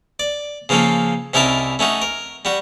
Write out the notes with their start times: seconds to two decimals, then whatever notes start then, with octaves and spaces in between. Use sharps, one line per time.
0.20 D5
0.69 C#3 F3 A#3 C#4 A4
1.34 C2 C#4 D#4 E4 A#4 A5
1.79 A3 C#4 D#4 F#4
2.02 A#4
2.45 G3 F#4